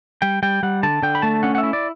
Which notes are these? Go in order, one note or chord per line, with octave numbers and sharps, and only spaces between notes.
G3 G5
G3 G5
G3 F#5
D3 A5
D3 G5
B5
A3 A5
C#4 F#5
F#5
E5
E4
D5